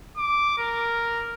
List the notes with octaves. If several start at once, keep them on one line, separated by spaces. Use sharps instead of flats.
D6
A#4